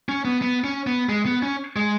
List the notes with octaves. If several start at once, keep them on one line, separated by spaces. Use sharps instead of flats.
C#4
B3
B3
C#4
B3
G#3
B3
C#4
G#3